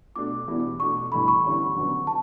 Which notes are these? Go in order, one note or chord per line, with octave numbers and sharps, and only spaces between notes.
B2 A3 D4 D6
E2 B2 G3 B3 E4
B2 A3 D4 C#6
G2 E3 A3 E4 B5
C#6
E2 D3 G3 C#4 E4
F#2 D3 F#3 B3
A5